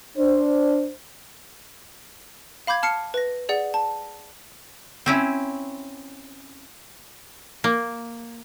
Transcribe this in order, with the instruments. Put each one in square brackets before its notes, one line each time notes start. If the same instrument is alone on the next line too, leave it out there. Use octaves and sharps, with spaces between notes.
[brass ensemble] D4 C5
[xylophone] F5 B5 D6 G6 G#6
A5 F6 C7 C#7
B4 A#6
G#4 D5 F#5
A5
[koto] C4 C#4 E4
A#3